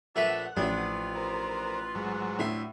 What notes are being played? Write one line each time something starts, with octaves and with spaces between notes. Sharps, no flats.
A#1 A3 D4 B4 E5 F#5
A1 F3 D4 F4 B4
A#4 C5
G#2 F#3
D2 A2 E5 C6